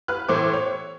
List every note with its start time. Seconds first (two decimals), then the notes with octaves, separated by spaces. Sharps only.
0.08 B4 F6 F#6
0.28 A2 E3 C5 D6
0.53 C#5